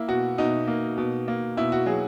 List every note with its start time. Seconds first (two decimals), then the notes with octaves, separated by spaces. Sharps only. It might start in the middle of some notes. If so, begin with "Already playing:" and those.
Already playing: A#3 E4
0.08 B2 F#4
0.38 B2 D#4
0.68 A#3
0.98 B2
1.28 A#3
1.57 B2 E4
1.72 F#4
1.86 F#3 G#4